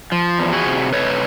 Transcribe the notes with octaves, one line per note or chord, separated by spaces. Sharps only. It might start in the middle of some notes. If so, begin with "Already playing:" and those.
F3
E2
F#4 G#4
C3
A3 B4 C#5